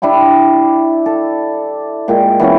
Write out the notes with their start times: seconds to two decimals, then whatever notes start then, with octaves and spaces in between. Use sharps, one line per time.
0.02 D4 E4 G4 C6
1.06 A4
2.08 A#2 G#3 G5
2.39 E3 B3 C#4